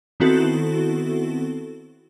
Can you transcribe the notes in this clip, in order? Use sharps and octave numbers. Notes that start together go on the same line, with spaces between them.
D#3 B3 C4 E4 F#4 A4